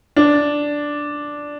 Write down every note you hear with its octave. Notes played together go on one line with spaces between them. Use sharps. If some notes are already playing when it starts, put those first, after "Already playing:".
D4